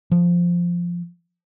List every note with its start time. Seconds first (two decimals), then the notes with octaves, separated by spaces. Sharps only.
0.12 F3